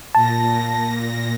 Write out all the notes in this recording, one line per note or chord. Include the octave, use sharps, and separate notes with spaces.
A#2 A5 A#6